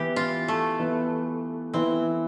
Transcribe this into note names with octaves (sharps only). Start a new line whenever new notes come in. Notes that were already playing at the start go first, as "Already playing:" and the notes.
Already playing: E3 B3 E4 G4
F4
A3
E3 B3 E4
E3 B3 C4 E4